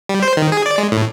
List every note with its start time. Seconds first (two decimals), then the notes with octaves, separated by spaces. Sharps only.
0.09 G3
0.23 C5
0.37 D#3
0.52 G#4
0.66 D5
0.78 G#3
0.92 A2